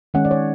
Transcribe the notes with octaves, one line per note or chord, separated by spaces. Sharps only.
D#3 G#3 C#4 F#5
D5
C#5